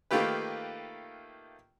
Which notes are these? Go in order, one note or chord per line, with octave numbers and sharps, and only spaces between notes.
D#3 A3 A#3 F4 G4 B4